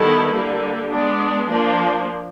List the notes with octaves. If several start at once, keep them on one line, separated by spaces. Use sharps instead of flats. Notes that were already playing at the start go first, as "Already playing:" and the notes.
Already playing: D#3 G3 B3 E4 A4
D3 G3 A#3
G#3 B3 D4
F3 A#3 D4